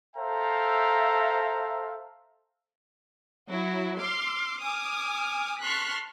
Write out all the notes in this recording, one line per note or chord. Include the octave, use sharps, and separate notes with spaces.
A4 C5 E5 F5 G5 A#5
F#3 E4 F#4
C6 D6 F6
G#5 D6 D#6 F6
A5 C6 C#6 F6 F#6 B6